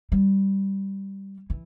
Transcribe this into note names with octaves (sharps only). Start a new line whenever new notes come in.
G3
E3